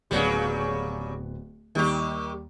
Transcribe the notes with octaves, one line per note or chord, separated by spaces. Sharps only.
D1 C#3 F#3 G3 B3 C#7
D#2 D#3 G3 G4